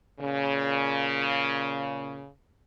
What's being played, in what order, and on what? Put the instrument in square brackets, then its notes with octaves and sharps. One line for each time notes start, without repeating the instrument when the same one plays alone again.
[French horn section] A#2 C#3